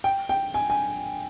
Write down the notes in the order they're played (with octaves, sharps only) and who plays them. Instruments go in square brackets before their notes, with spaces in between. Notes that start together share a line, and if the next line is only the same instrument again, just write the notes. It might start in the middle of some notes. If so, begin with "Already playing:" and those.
[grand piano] G5
G5
G#5
G#5